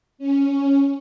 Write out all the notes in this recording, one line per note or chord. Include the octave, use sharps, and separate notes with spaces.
C#4